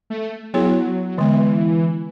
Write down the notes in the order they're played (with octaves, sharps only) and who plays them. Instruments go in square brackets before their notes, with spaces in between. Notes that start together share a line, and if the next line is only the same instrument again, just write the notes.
[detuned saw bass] A3
[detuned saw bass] F#3 [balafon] B3 E4 G#4 C#5
[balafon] D3 G#3 B3 [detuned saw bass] E3